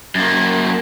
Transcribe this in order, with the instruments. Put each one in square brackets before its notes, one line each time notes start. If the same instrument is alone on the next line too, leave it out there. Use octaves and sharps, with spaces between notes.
[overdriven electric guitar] F#2 A#3